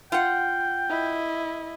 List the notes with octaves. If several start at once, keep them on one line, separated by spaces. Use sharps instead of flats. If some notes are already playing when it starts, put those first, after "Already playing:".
F4 F#5 G5
E4 D#5